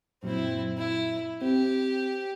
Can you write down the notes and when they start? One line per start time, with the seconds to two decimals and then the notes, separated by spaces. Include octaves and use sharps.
0.23 F#2 A#2 F#3 C4 E4
0.77 E4
1.42 C4 G4